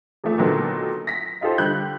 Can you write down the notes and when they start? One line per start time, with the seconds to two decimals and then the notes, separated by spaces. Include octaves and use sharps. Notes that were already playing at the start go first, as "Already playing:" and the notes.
0.24 E2 F3 A3 E5
0.38 A#2 D3 D#3 F#3 B3 A4
1.07 A#6 B6
1.41 D#4 F4 G4 A4 C5
1.58 D3 G3 F#6 G6